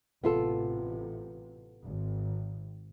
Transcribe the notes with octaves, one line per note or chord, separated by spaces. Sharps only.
A1 C3 B3 F4 A4
G#1